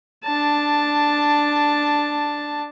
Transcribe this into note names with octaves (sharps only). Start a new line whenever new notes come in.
D4 A5